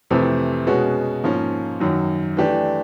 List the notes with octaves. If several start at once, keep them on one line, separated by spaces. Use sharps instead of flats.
F2 C3 E3 A3 C4
B2 G#3 C#4 F#4
G#2 F3 A#3 C#4
F#2 D#3 F#3
E3 A3 D4 G4